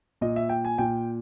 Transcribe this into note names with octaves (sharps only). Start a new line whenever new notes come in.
A#2 D#5
E5
G5
G#5
A#2 G5